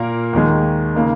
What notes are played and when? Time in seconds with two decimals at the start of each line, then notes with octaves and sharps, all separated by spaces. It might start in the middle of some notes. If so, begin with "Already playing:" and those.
Already playing: A#2 A#3 A#4
0.33 D#2 D#3 G#3
0.95 C#3 A#3 D#4